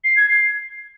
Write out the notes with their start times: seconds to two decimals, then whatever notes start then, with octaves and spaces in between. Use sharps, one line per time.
0.04 C7
0.17 G#6
0.29 C7